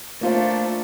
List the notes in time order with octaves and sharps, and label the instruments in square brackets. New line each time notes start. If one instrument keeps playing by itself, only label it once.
[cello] A3 D4 [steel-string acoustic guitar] A#3 F4 C5